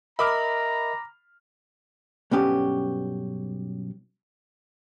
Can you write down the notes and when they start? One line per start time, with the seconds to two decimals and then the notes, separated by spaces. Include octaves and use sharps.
0.19 A#4 D#5 E5 A#5 B5 D6 F6
2.31 B1 G2 B3 C#4 G4